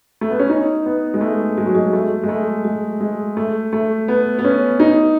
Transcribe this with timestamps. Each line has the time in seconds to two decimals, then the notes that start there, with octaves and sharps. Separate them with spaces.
0.21 A3
0.31 B3
0.39 C#4
0.49 D#4
0.86 B3
1.14 G#3
1.21 A3
1.58 G#3
1.65 F#3
1.75 G#3
1.93 A3
2.23 G#3
2.29 A3
2.64 G#3
3.01 G#3
3.37 A3
3.73 A3
4.08 B3
4.39 B3
4.44 C#4
4.80 D#4